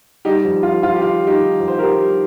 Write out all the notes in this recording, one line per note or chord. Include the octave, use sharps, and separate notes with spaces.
G3 D#4 G4
F2
F2 F4
F2 F4
G4
D#3 F4
G3
D#4 G4
D#3
F2
C5
D#3 G4 A#4
G3